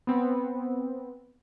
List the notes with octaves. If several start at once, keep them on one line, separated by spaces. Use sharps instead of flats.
B3 C4